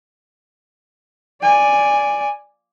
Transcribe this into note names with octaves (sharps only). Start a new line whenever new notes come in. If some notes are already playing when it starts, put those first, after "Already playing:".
D5 G#5